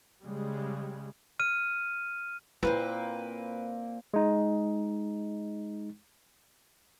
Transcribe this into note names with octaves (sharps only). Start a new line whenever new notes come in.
C#3 G3 G#3
F6 D#7
A#2 A#3 C4 E4 B4
G#3 D#4